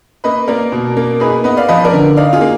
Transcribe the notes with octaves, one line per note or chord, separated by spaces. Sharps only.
A#3 B4 D#5
A#3 A#4 D5
B2
A#3
D#4 G#4 B4
B3 B4 D#5
D5 F5
F3 B4 D#5
A#4 D5
D3
D#4 D5 F5
F4 G#4
A#3